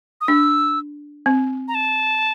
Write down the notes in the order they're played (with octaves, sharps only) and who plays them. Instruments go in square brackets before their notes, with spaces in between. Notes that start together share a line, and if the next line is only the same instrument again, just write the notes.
[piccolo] D#6
[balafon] D4 [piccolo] E6
[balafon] C4
[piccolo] A#5
A5